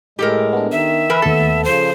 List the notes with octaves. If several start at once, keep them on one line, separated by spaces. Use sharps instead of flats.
A2 G#3 G4 A4 A#4
B3 D4
D#3 E5
E3 A#4 B4
D#2 A3 B3 A4 A5
C#3 F3 C5